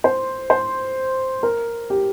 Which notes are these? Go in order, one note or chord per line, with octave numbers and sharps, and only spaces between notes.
C5
C5
A#4
G4